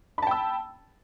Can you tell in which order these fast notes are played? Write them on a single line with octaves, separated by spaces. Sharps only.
B5 A5 G5 E6